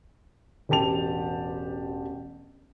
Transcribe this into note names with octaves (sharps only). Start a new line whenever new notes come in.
E1 A1 G4 A5 F7